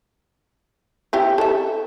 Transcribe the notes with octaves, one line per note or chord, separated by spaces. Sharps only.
C4 E4 G4
A4 E5